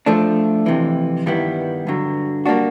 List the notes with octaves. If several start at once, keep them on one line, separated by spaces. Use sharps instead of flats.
F3 A3 D4
F2 C3 E3
G2 D#3 G3 B3 E4
G2 D3 F#3
G3 A#3 D4 F#4